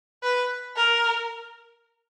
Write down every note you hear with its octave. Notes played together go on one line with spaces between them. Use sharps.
B4
A#4